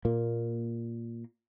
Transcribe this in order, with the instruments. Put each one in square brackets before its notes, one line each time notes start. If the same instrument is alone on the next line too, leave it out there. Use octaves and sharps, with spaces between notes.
[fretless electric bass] A#2 A#3